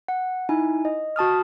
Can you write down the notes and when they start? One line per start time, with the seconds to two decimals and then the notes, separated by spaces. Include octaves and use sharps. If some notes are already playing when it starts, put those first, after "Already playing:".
0.08 F#5
0.49 D#4 E4 G#5
0.85 D#5
1.16 F#4 A5 D#6 F6